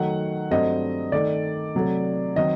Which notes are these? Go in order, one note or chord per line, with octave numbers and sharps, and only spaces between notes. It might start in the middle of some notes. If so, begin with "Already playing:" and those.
Already playing: D#3 F#3 A3 F#5
G2 F#3 A3 C4 D#5
D#3 A3 D#4 D5
C3 F#3 A3
D#3 F#3 C4 D#4 D#5